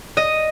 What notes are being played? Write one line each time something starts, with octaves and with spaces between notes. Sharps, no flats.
D#5